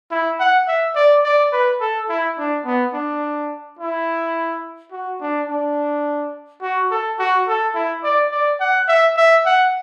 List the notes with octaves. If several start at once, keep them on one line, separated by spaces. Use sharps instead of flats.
E4
F#5
E5
D5
D5
B4
A4
E4
D4
B3
D4
E4
F#4
D4
D4
F#4
A4
F#4
A4
E4
D5
D5
F#5
E5
E5
F#5